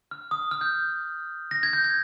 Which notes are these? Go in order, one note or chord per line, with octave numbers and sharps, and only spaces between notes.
F6
D#6
F6
G6
A#6
G#6
G6
G#6